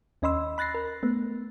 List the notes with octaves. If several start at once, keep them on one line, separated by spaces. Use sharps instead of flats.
D#2 C#4 D#5 B5 C6 E6
B5 F#6 A6 A#6 C7
A#4
A3 B3